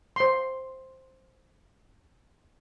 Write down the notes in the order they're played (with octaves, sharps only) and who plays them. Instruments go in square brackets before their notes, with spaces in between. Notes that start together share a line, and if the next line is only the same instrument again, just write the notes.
[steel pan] C5 C6